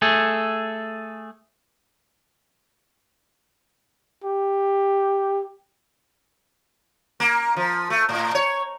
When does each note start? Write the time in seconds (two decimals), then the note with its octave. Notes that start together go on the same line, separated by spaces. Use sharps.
0.02 A3 G#4 A4
4.24 G4
7.20 A#3
7.56 F3
7.90 A3
8.09 A2
8.35 C#5